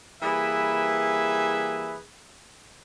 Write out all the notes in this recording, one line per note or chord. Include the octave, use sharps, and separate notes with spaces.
E3 G3 A#3 G#4 B4 E5